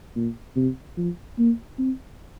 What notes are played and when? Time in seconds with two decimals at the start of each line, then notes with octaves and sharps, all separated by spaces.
0.16 A#2
0.56 C3
0.97 F3
1.38 A#3
1.79 C4